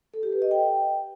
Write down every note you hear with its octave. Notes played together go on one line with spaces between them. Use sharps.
A4
G4
B4
D#5
G5